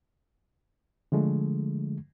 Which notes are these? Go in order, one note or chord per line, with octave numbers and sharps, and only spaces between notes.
D3 F3 G#3 A3